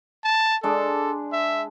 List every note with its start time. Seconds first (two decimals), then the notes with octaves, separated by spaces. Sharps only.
0.24 A5
0.63 G#3 D4 A4
1.32 E5